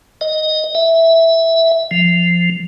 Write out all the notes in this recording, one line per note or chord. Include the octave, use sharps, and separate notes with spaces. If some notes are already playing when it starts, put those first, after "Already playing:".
D#5
E5
F3